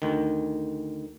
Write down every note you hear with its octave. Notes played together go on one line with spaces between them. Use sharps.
D2 D#3